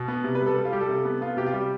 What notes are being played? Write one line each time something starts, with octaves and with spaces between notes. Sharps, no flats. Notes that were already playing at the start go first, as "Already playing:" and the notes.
Already playing: B2
B3
C3
B4
G3
A4
G3
F4
G3 G4
A4
C3
B3
B3 F4
C3 G4
F4
G3 G4